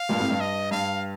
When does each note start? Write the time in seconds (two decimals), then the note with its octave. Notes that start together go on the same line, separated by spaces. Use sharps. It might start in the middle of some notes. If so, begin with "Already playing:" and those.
Already playing: F5
0.09 G2 A#2
0.20 A2 C3
0.31 G2
0.40 D#5
0.71 G2 F5